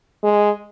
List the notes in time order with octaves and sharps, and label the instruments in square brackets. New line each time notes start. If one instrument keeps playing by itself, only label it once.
[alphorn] G#3